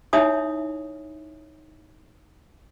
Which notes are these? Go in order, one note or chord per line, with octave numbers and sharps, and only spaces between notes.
D#4 E4 C#5 E5 G#5 D#6